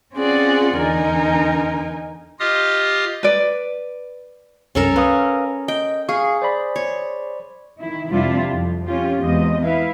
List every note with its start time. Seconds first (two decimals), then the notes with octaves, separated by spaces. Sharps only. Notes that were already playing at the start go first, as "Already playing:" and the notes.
0.15 C4 C#4 F4 G#4 D5 F#5
0.77 E2 D3 D#4 A#4 G#5
2.40 F4 G4 D#5 F5 D#6 F6
3.23 B4 D5
4.75 C2 F#2 C#4 A4 A#4
4.96 C#4 B4 F5 D#6
5.68 D#5 G5
6.09 G#4 F5 C#6
6.42 C5 D5 B5
6.76 C#5
7.80 D#3 E4
8.11 F2 C3 G3 D4 E4 F4
8.51 F2
8.87 C#4 F4 G4
9.19 E2 G#3 C4 D#5
9.63 E4 B4 F5